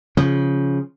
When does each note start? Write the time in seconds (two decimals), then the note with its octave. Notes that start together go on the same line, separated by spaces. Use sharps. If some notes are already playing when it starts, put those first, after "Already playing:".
0.17 C#3 F3